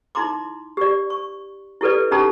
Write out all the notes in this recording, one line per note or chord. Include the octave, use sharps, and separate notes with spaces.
D#4 E4 A#5 C6 D6
G4 D5
C#6
E4 G4 A4 B4 D5
C#4 D#4 E4 G4 A4 A#5